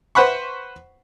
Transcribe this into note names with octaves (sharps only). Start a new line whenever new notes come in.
B4 C5 F#5 B5 C#6